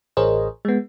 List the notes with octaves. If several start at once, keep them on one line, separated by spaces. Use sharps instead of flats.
A1 G#4 A#4 C5 C#5 D#5
G#3 B3